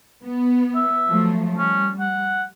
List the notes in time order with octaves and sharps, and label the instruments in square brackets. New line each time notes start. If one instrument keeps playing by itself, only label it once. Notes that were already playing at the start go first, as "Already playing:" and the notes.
[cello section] B3
[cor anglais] E5
[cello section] F3 F#3 A3
[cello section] G3 [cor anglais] C#4
[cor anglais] F#5